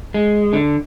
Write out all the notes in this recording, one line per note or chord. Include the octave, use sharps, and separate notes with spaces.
G#3
D3